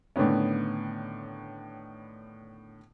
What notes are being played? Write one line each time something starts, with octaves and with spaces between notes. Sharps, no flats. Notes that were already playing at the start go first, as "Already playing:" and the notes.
A2 D3 D#3 B3 C#4